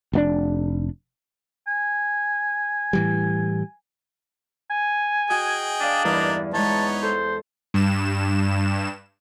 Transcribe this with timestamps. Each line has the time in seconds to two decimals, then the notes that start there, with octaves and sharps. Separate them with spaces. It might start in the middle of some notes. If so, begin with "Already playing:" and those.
0.13 F1 B2 D4
1.67 G#5
2.93 A2 E3 G3
4.71 G#5
5.30 F#4 G#4 D#5 G5
5.81 D4 D5 F5 D#6
6.05 E2 G2 E3 A#3 D#4 D#5
6.54 E3 G#3 B3 D#4 C#5 A5
7.03 A4 C5
7.74 G2 E7